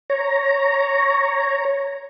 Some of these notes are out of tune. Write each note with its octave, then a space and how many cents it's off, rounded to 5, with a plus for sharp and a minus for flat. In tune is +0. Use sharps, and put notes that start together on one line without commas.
C#5 +0 A#5 +0